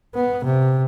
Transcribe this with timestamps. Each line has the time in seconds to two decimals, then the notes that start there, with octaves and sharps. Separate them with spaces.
0.14 B3
0.44 C3